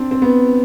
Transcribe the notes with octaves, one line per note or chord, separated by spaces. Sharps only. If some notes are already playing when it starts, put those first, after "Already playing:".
Already playing: C4 D4
C4
B3